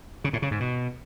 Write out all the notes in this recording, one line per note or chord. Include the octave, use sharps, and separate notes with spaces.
C#3
A2
C#3
G#2
B2